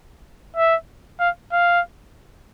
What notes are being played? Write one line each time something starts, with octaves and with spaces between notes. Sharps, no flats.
E5
F5
F5